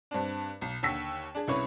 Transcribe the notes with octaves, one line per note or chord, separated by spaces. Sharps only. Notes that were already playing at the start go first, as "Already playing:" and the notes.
G2 C4 D4
B1
D#2 D3 E6 B6
D4 G#4
C2 C#3 E4 B4 C#5 C#6